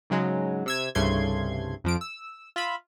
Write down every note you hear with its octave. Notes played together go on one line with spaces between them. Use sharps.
G#2 C#3 F#3 G#3
C3 E6 G#6
C2 G2 C#3 A3 C6 G#6
F2 F3 D7
E6
F4 E5 B5